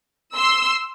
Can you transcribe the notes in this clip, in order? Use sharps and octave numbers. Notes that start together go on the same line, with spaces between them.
C6 E6